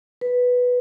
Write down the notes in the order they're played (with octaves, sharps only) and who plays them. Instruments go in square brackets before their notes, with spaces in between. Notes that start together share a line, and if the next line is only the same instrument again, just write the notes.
[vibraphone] B4